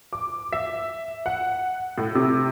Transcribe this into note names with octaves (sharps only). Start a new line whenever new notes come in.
D6
E5
F#5
A2
C3